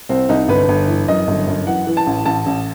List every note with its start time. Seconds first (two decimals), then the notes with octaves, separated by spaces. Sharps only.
0.09 C2 C4
0.29 C2 D#4
0.48 G1 B4
0.68 G1
0.88 E3
1.08 F#2 D#5
1.27 G1
1.47 F#2
1.67 E3 F#5
1.87 E3
1.97 A5
2.07 A1
2.25 A1 A5
2.46 A1